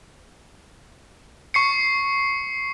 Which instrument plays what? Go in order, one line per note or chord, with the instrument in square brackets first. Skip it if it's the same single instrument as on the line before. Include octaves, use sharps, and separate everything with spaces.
[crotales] C#6 C7 C#7